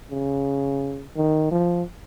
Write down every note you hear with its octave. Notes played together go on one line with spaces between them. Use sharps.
C#3
D#3
F3